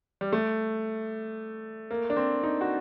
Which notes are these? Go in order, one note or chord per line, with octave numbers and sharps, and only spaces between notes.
G3
A3
A#3
D4
C4
D#4
F#4